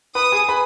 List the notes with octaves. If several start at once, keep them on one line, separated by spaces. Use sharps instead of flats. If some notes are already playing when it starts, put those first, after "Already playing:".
B4 B5 D#6
G#4 G#5
B4 B5